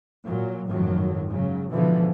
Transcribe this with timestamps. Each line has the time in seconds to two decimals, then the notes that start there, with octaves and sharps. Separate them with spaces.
0.25 A#2 F#3
0.66 G#1 F#2 A2 D#3 F3 F#3
1.27 G#2 C#3 F#3
1.70 G#2 B2 D3 E3 F3